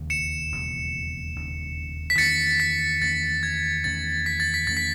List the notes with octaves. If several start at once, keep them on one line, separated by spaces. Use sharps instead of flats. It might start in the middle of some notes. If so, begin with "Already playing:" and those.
Already playing: E1 D#2 C#3
C#7 E7
E1 D#2 C#3
E1 D#2 C#3
B6
E2 D#3 A3 C#4 A6 C#7
B6
E2 D#3 A3 C#4 A6
G#6
E2 D#3 A3 C#4 A6
B6
A6
B6
E2 D#3 A3 C#4 A6
B6